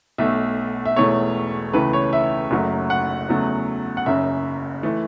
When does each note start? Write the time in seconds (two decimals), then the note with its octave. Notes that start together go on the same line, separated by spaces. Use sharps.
0.18 B1 B2 A3 E5
0.86 E5
0.96 E1 E2 E3 A3 C#5
1.73 C#2 C#3 E3 A3 B4
1.93 C#5
2.13 E5
2.51 F#1 F#2 F#3 A3
2.90 F#5
3.29 E2 C#3 F#3 A3
3.97 F#5
4.06 F#1 F#2 C#3 E5
4.83 E3 A3